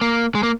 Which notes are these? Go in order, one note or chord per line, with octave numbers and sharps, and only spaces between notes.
A#3
G#3
A#3